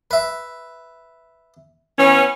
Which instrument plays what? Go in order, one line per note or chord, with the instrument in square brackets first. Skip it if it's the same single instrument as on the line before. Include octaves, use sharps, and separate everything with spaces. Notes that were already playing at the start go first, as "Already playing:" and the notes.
[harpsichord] B4 E5
[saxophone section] E3 B3 C#4